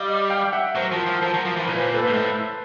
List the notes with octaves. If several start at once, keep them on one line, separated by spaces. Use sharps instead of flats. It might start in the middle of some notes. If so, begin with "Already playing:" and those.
Already playing: G3 D#5 F5
F5 G5
G5
E5 F#5
F#3 A#4 C5
F3
F3
F3 A#4 C5
F#3
F3
E3
A#2 B4
C5
A4 B4
G#2
A2